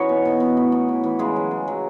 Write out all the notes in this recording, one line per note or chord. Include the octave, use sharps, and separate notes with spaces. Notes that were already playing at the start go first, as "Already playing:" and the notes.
Already playing: E3 C#4 D#4 F#4 C#5 D#5 F#5
B2
B2
B2
A2
A2
E3
E3
C#3 G#3 G#4
F#3
C#3
F#3